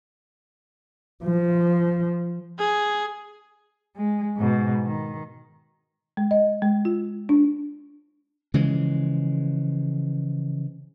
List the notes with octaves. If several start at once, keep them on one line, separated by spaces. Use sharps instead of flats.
F3
G#4
G#3
G#2 B2
D#3
G#3
D#5
G#3
F4
D4
C#3 E3 F3 G#3